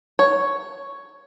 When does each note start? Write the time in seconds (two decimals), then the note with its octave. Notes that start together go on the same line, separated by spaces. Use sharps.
0.19 C#5